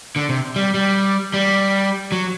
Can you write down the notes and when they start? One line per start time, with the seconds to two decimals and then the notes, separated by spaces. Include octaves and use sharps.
0.16 D3
0.29 C3
0.56 G3
0.74 G3
1.34 G3
2.12 F#3